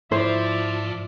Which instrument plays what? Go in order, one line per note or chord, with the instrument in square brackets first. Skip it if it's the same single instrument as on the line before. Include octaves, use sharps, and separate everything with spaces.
[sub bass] G#2 [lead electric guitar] F3 [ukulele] E4 C5 [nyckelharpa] D5 E5